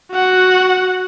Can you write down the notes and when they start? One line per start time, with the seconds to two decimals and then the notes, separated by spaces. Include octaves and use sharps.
0.12 F#4 F#5